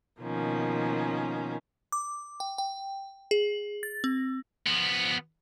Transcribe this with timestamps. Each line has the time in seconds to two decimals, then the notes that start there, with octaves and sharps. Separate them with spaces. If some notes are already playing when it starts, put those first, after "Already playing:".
0.20 B2 D#3 F3 A#3 C#4
1.92 D6
2.40 G5
2.58 G5
3.31 G#4
3.83 A6
4.04 C4
4.67 F3 B3